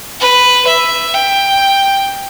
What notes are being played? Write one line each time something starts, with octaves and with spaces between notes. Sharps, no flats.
B4
E5
G5